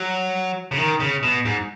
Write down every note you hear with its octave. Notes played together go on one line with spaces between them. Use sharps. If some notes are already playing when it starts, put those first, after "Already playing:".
Already playing: F#3
C#3
D#3
C#3
B2
G#2